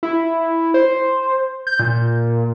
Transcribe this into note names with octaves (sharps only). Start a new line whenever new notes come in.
E4
C5
G6
A#2